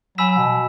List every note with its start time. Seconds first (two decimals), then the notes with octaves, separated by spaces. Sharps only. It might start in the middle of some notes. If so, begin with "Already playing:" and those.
0.18 F#3 G#5 B5 E6 B6 E7
0.38 B2